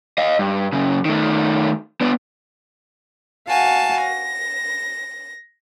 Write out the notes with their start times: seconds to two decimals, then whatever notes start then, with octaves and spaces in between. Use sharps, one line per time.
0.18 D#5 F5
0.39 G2
0.73 F#2 C#3
1.05 D#3 A3
2.01 B3 D4
3.49 F#4 F5 G#5 A5
4.01 A#6